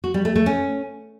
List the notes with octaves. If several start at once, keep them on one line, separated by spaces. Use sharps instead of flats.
F#4
G3
A3
A3
C#4